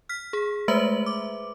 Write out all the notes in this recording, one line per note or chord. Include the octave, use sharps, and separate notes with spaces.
F6 B6
G#4
G#3 A3 B4 C5 E5 F#7
D6